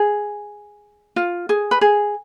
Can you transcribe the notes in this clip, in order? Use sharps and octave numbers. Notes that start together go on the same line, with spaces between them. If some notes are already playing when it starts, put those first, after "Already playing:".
Already playing: G#4
F4
G#4
B4
G#4